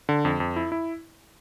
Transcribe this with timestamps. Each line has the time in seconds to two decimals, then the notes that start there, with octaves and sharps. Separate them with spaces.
0.09 D3
0.25 F2
0.40 F2
0.56 E4
0.72 E4